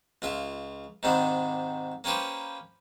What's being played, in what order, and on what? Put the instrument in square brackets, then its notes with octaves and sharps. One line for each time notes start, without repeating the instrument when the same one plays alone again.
[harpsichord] C#2 F4 E5
G#2 C3 D#3 D4 B5
A#3 C#4 G4 B4 C5